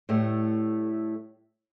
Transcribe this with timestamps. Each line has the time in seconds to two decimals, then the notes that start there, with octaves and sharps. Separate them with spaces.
0.09 A2 G3 A3